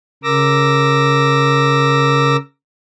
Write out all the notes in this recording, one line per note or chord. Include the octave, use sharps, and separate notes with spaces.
C#3 A#4 D6 E6 A#6